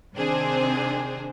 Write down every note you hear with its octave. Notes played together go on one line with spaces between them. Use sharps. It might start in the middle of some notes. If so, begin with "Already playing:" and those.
C3 D#3 C4 D4 G#4 C5